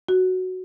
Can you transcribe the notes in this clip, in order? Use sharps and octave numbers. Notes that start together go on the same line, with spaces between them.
F#4